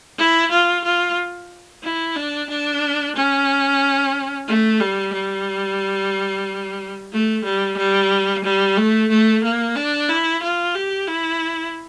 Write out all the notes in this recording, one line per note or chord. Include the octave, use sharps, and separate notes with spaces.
E4
F4
F4
E4
D4
D4
C#4
A3
G3
G3
A3
G3
G3
G3
A3
A3
A#3
D4
E4
F4
G4
E4